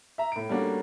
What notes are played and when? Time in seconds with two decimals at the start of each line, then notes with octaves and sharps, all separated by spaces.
0.18 E5 A#5
0.32 A2 D7
0.49 G3 A3 A#3 C#4 D4 F#4